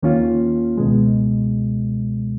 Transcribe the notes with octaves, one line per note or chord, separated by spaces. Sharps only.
D#2 D#3 A#3 C#4 F4
C#2 B2 G#3